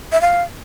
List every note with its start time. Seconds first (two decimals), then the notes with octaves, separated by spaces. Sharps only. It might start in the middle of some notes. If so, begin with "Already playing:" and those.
0.12 E5
0.21 F5